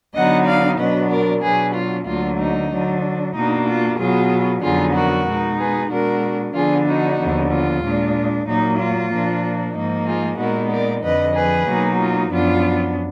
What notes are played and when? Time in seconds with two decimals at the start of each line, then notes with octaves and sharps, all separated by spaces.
0.15 D3 F#3 B3 D#4 D#5 F#5
0.47 D5 F5
0.79 B2 F#3 B3 D4 B4 D#5
1.11 A#4 D5
1.43 B2 F#3 D4 G#4 B4
1.75 F4
2.07 D2 D3 F#3 A#3 F4
2.39 D#4
2.72 D3 F#3 D4
3.35 B2 A#3 D4 D#4
3.67 F4
3.99 B2 F#3 B3 F4 G#4
4.63 F2 D3 F#3 B3 D#4 F4 G#4
4.95 F#4 A#4
5.27 B2 G#3 D#4
5.59 G#4 B4
5.91 B2 G#3 D4 F#4 A#4
6.55 D3 F3 B3 D4 F4 G#4
6.87 D#4 F#4
7.19 D#2 D3 F3 B3
7.52 F4
7.83 A#2 G#3 D4
8.47 A#2 F#3 A#3 D#4
8.79 F4
9.12 A#2 F3 A#3 D4
9.75 G#2 F3 A#3 D#4
10.07 F4 G#4
10.39 A#2 G#3 B3 D#4 F#4 A#4
10.71 A#4 D5
11.03 F2 D3 F3 B4 D#5
11.35 G#4 B4
11.68 B2 F#3 A#3 D#4
12.00 F4
12.31 F#2 F3 B3 D4 F4